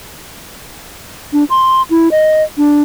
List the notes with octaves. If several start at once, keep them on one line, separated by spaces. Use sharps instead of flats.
D4
C6
E4
D#5
D4